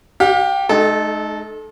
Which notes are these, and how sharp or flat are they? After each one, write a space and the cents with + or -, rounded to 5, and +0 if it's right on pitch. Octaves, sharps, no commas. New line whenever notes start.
G4 +0 F5 +40
G#3 +45 D#4 -20 A4 -20